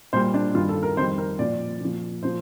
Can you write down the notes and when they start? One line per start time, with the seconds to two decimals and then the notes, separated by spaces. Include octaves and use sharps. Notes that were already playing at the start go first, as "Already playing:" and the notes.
0.13 A#2 G3 C5
0.34 D4
0.55 G2 D#3 G3 F4
0.69 A4
0.83 A#4
0.97 F2 D#3 G3 C5
1.18 A#4
1.39 A#2 F3 D5
1.81 A#2 F3
2.23 A#2 F3 C5